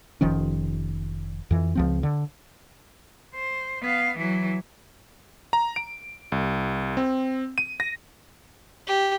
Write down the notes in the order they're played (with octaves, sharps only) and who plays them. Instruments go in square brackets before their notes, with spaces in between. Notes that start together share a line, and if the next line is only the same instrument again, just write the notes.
[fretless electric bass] F1 D#3 F3 C#4
F2 E3
C#2 F3 C4
D3
[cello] C5
B3 F5
E3 F#3
[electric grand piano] A#5
D7
C2
C4
D#7
A#6
[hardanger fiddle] G4